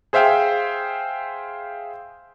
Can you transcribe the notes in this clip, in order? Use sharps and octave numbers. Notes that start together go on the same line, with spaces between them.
G#4 C5 E5 F5 G5